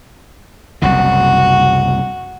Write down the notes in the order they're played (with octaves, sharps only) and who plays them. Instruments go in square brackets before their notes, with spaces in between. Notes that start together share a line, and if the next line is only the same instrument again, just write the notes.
[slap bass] F#1 C2 C#3 [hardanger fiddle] F#4